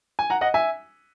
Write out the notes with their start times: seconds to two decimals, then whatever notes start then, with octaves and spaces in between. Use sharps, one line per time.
0.19 G#5
0.30 F#5 A#5
0.41 D#5 F#5
0.54 E5 G#5